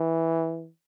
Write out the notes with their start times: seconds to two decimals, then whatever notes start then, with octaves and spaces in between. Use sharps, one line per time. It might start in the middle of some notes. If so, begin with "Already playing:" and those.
Already playing: E3